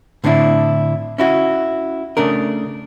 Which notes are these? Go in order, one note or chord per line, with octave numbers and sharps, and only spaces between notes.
A2 D3 C4 D4 E4
C#4 E4 F#4
C#3 A3 D4 A#4